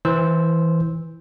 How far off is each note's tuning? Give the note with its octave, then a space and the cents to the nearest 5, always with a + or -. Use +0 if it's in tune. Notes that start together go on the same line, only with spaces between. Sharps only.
E3 -10 C5 +0 E6 -10